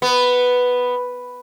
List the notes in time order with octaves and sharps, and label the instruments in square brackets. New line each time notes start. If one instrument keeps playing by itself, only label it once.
[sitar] B3